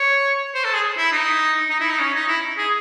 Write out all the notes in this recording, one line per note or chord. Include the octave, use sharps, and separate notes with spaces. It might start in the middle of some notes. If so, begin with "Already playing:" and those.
Already playing: C#5
C5
A4
G#4
E4
D#4
D#4
E4
D#4
C#4
D#4
E4
G#4